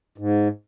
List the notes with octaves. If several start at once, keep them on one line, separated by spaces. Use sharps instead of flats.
G#2